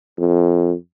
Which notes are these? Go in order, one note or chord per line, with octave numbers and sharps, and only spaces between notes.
F2